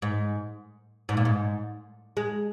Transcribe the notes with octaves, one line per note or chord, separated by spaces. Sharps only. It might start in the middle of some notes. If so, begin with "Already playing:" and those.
G#2
G#2
A#2
G#2
G#3